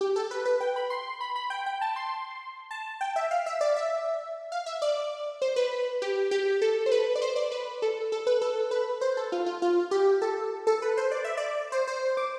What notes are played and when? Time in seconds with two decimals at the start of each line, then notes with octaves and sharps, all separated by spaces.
0.01 G4
0.16 A4
0.31 B4
0.45 B4
0.61 G5
0.76 B5
0.90 C6
1.21 B5
1.36 B5
1.50 G5
1.66 G5
1.81 A5
1.96 C6
2.71 A5
3.01 G5
3.16 E5
3.31 F5
3.46 E5
3.61 D5
3.76 E5
4.52 F5
4.66 E5
4.82 D5
5.42 C5
5.56 B4
6.02 G4
6.31 G4
6.62 A4
6.86 C5
6.92 B4
7.15 D5
7.22 C5
7.36 D5
7.52 B4
7.82 A4
8.12 A4
8.27 B4
8.42 A4
8.71 B4
9.01 C5
9.17 A4
9.32 F4
9.46 F4
9.62 F4
9.91 G4
10.22 A4
10.67 A4
10.82 B4
10.97 C5
11.11 D5
11.25 E5
11.37 D5
11.72 C5
11.87 C5
12.17 D6